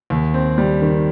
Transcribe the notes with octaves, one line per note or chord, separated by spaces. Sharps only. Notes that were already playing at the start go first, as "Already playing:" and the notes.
D#2
C4
G3
D#3